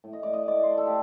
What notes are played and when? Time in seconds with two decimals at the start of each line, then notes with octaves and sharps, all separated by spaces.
0.04 A2
0.13 D#5
0.23 A2 D5
0.33 D#5
0.48 A2 D5
0.63 C5
0.70 A3
0.78 A4
0.87 G4